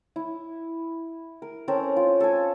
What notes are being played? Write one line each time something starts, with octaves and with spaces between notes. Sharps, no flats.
E4
A#4
C4 C#4 A4 A#4
F4
A4 G#5